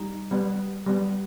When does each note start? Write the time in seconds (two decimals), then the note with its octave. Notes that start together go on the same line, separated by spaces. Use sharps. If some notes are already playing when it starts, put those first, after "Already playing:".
Already playing: G3 D#4
0.31 G3 B3
0.86 G3 B3